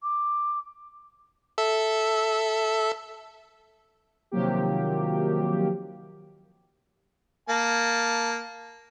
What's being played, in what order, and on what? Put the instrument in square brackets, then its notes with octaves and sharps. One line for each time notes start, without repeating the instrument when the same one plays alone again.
[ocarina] D6
[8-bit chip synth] A4 E5
[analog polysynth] C3 D#3 F3 F#3 A#3 G4
[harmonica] A#3 A5